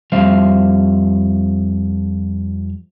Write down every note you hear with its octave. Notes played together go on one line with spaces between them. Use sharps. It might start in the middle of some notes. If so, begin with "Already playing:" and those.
F2 G3 C5 E5 F5